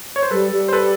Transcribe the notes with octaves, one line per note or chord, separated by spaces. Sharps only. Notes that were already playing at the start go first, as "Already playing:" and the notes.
C#5
C5
G3 A4 B4
G3
C5
A4 B4